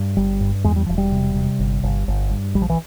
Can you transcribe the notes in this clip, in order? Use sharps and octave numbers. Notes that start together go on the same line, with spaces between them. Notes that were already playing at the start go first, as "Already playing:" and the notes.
Already playing: G2
G1 G3
G2
E2 G#3
G3
E1 F3
G3
C3
C3
G1
G1
G1
G2
A#1 G3
F3
E3